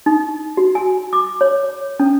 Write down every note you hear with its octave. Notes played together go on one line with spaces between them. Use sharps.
D#4
F#4
G#5
D6
C#5
C#4